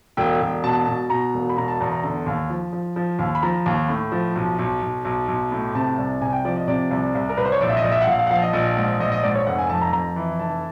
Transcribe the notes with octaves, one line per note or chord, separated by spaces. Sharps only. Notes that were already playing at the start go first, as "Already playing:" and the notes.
E1 G5
E1
B2 A5
B2
B2 A#5
E1
B5
B2 A#5
A5
E2 A#5
A#5
D3
D#2
F3
F3
F3
D#2
B5
F3 A#5
D#2
A2
F3
B1
B1
B1
B1
B1
A2
C3 A5
C2
C3 G#5
G5
F3 D5
D#5
C3 D5
C2
C2
A#4
C2 B4
C5
C#5
A#1 D5
E5
D#5
A#1
E5
F#5
A#1 F5
F5
F#5
F3 F5
D#5
A#1 D#5
G#2
A#1 D#5
D#5
G#2 D5
C#5
F1 F#5
G#5
F2 A5
A#5
F2 A#5
E3
F1 A5